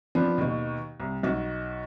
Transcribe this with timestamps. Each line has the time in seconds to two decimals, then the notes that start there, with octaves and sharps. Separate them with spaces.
0.15 F3 B3 C4 D4
0.38 D#2 B2
1.00 C2
1.23 B1 F#4